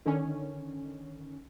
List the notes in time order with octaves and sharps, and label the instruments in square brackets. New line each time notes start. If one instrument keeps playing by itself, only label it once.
[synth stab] D3 D#3 C#4